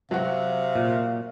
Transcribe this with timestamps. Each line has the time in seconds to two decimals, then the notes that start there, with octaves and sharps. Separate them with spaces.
0.11 C3 F#3 F#4 F5
0.75 A#2